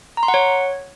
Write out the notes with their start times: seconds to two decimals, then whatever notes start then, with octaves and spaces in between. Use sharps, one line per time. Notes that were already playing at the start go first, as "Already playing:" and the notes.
0.17 A#5
0.23 C6
0.28 F#5
0.34 C#5